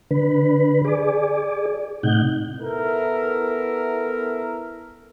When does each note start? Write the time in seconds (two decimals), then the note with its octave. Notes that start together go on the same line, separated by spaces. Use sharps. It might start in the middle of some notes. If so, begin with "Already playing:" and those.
0.11 D3 B4
0.85 G#4 D5
2.03 A2 C3 D#4 F#5 G6
2.60 B3 E4 A4 A#4 E5